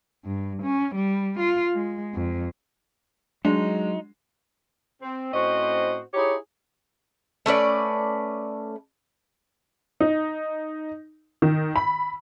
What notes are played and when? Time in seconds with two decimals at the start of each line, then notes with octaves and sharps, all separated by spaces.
0.25 G2
0.63 C#4
0.95 G3
1.40 F4
1.75 G#3
2.15 F2
3.45 F#3 G#3 D4 D#4
5.02 C4
5.32 A2 C4 C#4 F#4 C5 D#5
6.14 D#4 E4 G4 G#4 C#5
7.46 A3 C#4 B4 D5
10.00 D#4
11.42 D#3
11.76 B5